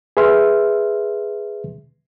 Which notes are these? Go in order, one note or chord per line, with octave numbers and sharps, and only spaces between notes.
G#4 B4 E5 C6 F6